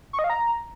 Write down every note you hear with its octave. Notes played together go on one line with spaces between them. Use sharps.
C#6
D#5
F5
A#5